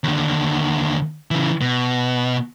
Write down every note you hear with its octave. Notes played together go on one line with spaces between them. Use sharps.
D#2 D3
C#3 E3
B2